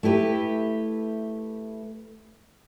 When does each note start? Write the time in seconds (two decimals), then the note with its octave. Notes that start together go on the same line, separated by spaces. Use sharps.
0.03 A3 E4 G4 B4